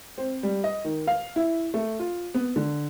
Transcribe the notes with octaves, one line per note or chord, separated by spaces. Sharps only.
C4
G3
D#5
D#3
F5
E4
A3
F4
B3
D3